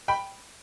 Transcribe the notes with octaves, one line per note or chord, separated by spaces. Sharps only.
G5 B5